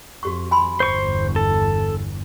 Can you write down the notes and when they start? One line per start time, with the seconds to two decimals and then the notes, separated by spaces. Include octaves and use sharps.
0.23 F2 F#4 G4 C#6
0.51 G#5 B5 C6
0.80 G1 E2 C5 C#6
1.36 A4